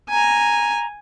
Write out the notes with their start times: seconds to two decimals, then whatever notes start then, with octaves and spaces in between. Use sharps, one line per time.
0.10 G#5 A#5